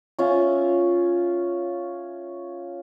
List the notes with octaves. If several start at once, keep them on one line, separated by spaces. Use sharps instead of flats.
C#4 F4 E5